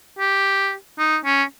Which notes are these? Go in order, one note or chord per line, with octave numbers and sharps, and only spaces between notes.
G4
D#4
C#4